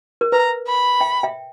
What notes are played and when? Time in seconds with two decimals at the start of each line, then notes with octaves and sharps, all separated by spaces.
0.21 A#4
0.32 B4 A#5
0.67 B5
1.01 E5 G5
1.23 E5 G5